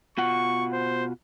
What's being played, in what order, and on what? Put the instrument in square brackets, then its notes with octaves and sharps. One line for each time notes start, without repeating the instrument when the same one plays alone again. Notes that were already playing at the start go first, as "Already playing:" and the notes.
[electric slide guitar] B2 F4 F#5 [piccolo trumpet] C#6
[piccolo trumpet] C5